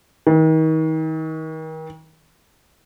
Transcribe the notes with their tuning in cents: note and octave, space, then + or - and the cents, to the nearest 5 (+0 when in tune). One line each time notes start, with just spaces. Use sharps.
D#3 +35